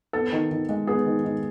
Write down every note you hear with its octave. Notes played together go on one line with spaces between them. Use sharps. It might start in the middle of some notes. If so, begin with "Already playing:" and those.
B3 A4
D#3
D#3
G#3
B3 G#4
D#3
D#3